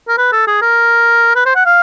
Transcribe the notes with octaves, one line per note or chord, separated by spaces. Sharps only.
A#4
B4
A4
G#4
A#4
B4
C5
F#5
F5